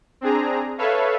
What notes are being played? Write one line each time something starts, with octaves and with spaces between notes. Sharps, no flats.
C4 D4 G#4 A#5
A4 B4 C#5 E5 F5